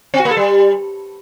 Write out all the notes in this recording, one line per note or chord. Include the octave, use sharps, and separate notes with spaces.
C4
F#4
A#3
A4
G3